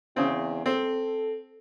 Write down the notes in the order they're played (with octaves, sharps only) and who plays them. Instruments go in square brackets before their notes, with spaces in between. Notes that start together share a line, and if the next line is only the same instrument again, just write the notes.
[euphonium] E2 [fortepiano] C#3 C4
[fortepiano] C4 [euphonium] A4